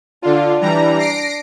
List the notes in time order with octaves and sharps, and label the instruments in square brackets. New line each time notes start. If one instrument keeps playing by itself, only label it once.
[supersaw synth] D3 F4 [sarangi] D4
[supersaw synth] E3 G3 A#5
A#6 C7 D7